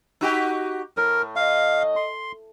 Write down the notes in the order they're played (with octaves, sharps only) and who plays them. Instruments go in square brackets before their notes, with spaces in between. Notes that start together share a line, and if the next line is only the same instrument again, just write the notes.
[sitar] D#4 F#4 G4
[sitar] A2 [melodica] A#4
[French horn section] D#5 [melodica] F5
[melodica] C6